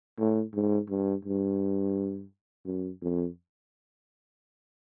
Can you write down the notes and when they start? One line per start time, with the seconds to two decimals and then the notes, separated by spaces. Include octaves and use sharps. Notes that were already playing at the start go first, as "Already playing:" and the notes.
0.19 A2
0.54 G#2
0.90 G2
1.25 G2
2.66 F#2
3.02 F2